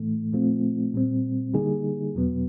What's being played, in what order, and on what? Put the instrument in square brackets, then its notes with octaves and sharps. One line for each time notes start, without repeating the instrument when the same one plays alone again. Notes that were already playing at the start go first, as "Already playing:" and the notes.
Already playing: [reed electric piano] A2 E3 A3
A#2 F3 A3 C4 F4
A#2 G3 C4
D3 G3 A#3 D#4 G#4
E2 B2 F#3 B3